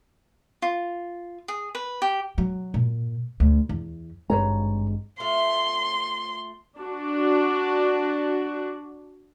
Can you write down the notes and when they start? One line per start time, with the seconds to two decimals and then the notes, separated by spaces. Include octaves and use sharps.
0.62 F4
1.48 G#4
1.75 B4
2.02 G4
2.38 F#3
2.74 A#2
3.40 D2
3.69 E2
4.30 G#1 G2 G#3 B4 C#5 A#5
5.20 A3 F4 E5 C6
6.77 D4 F#4